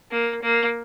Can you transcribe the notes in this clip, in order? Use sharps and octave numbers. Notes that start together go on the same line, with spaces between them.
A#3
A#3